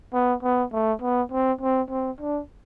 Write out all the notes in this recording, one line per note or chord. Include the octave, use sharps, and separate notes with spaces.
B3
B3
A3
B3
C4
C4
C4
D4